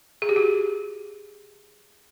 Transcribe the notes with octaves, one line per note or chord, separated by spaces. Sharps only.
G#4
G4
F#4 G#4